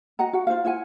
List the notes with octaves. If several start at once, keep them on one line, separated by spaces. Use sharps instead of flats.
F#4 D#5 F#5 A#5
F#4 F#5
F4 F#4 C5 F5
E4 F4 F#5 G#5